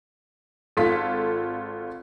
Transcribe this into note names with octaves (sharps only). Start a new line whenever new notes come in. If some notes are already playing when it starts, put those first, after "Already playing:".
G#1 F4 A4 B6